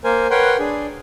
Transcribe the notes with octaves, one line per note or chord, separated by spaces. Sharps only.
A#3 A#4 C5 G#5
A#4 B4 C#5 F#5 G5 C6
D4 G#4